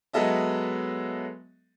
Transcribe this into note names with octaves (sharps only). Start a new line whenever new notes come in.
F#3 G#3 B3 A4 D#5 E5